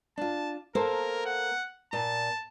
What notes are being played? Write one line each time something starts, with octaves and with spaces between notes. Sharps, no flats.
D4 F4 A5
A#3 A4 A#4 C5
F#5
A#2 A5